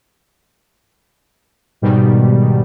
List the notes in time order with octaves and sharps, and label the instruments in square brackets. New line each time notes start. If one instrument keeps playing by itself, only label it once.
[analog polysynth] G#2 B2 D#3 G3